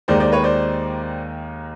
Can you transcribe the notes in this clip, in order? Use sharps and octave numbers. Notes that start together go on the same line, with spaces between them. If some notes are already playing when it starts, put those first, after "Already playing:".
D#2 D#3 G#3 C5 D5
C5 D5
B4 C#5
C5 D5